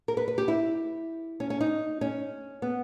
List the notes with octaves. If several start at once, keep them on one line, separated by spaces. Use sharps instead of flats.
A#4
B4
B4
G4
E4
C#4
C#4
D#4
C#4
B3